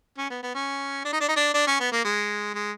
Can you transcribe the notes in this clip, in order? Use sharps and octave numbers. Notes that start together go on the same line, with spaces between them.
C#4
B3
B3
C#4
D4
D#4
D4
D#4
D4
D4
C#4
B3
A#3
G#3
G#3